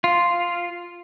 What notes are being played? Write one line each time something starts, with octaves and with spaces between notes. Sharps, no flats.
F4